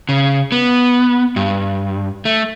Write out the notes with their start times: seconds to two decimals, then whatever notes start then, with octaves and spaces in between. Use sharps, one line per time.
0.09 C#3
0.52 B3
1.36 G2
2.25 A3